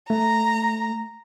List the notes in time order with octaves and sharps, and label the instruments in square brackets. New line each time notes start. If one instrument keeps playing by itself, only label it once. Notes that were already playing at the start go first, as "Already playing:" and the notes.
[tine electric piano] A3 [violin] A#5